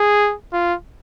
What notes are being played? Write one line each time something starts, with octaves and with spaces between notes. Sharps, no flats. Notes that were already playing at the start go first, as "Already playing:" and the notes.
Already playing: G#4
F4